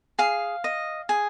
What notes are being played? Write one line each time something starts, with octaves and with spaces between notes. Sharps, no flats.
G#4 F5
D#5
G#4